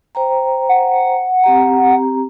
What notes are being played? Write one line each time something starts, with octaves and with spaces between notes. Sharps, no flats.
C5 G5 A#5
F#5
C4 G4 A#5